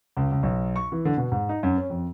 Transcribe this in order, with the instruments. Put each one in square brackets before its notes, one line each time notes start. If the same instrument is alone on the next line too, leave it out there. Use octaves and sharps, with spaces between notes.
[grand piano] C#2
C#2
B1
C#6
E3
D3
B2
G#2
D#4
F#2
C#4
F2